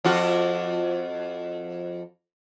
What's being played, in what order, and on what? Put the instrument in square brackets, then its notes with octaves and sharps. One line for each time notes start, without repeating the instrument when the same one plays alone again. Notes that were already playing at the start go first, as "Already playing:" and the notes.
[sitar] F2 F4 F#4